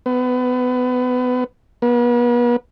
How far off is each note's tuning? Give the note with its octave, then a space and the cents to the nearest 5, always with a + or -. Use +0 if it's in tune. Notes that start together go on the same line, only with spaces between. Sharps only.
B3 +25
B3 -40